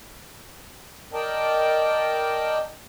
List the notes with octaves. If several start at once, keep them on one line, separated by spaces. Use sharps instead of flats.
A#4 D5 D#5 G5 A5